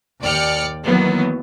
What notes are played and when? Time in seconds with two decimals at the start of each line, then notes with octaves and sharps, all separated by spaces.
0.22 D#2 D5 G5 F6 C#7
0.84 D#3 E3 F#3 A#3 B3